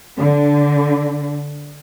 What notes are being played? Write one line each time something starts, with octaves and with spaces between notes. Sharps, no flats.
D3